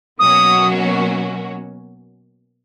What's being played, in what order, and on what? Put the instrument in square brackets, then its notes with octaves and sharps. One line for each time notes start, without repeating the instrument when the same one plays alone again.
[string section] B2 F#3 A#3 C#4 F#4 [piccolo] D#6